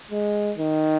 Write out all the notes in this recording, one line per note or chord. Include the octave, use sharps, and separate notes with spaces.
G#3
D#3